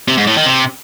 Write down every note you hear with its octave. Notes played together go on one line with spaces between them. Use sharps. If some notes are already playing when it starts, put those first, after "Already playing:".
C3
G#2
A2
D#3
C3